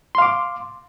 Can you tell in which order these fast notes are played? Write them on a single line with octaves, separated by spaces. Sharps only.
C6 F5 D6